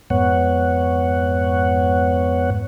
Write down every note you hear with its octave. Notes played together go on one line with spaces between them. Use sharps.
F2 G#2 B3 C#5 F#5